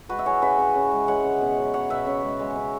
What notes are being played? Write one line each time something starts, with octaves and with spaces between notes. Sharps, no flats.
G#3 F#4 B4
E5
E3 G#4 C#5
C#3 B4 E5
C#3
C#3
G#3
G#3 C#5 F#5
C#3
B2
F#3
F#3 C#5 F#5
B2 B4 E5
C#3
G#3
G#3
C#3